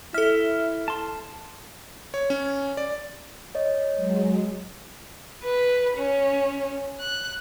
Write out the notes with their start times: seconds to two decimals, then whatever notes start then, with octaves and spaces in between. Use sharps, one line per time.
0.14 E4 A4 E5 F6
0.88 A5 C6
2.14 C#5
2.30 C#4
2.77 D5
3.55 C#5 D#5
3.95 F#3 G#3
5.44 B4
5.97 C#4
7.00 F#6